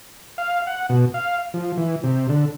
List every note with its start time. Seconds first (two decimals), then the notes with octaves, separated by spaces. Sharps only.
0.38 F5
0.67 F#5
0.89 B2
1.14 F5
1.54 F3
1.77 E3
2.04 C3
2.29 D3